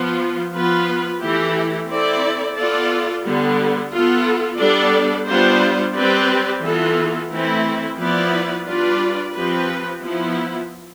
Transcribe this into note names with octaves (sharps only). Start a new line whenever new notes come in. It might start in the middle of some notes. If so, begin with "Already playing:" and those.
Already playing: F3 B3 F4
F3 B3 F4 B4
E3 A3 E4 G4
C4 E4 A4 D5
B3 F4 A4 D5
D3 G3 B3
B3 F4 A4
G3 B3 D4 A4 D5
G3 B3 D4 F4 C5
G3 C4 G4 B4 D5
E3 B3 F4 A4
E3 A3 C4 E4
F3 B3 E4 B4 D5
G3 D4 F4 B4 D5
F3 C4 G4 B4
F3 B3 E4